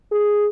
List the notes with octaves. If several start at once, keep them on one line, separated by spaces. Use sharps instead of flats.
G#4